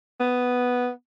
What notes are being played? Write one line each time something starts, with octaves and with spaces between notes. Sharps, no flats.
B3